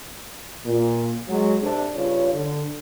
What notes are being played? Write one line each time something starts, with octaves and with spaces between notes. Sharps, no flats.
A#2
F#3 G#3
C3 D4 A4
G2 C#3 F4 C#5
D3